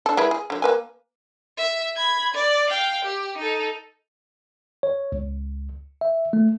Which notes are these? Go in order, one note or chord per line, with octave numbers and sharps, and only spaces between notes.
D4 A4
G#3 E4 B4
G#4
D3 F#3
A#3 B4 G#5
E5
B5 G#6
D5
F5 G5
G4
D#4 A4
C#5
C#2
E5
A3